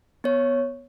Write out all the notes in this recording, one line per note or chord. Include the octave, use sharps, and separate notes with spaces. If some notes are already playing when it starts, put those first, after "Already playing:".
B3 C#5